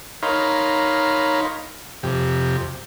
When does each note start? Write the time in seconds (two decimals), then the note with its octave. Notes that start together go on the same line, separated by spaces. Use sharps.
0.23 D#4 A#4 C#5 F5 B5 C6
2.03 F2 C3 G4